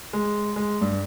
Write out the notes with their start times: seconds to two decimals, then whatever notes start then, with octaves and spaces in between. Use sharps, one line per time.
0.13 G#3
0.56 G#3
0.81 G2